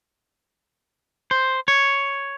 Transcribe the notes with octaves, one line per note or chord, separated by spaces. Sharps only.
C5
C#5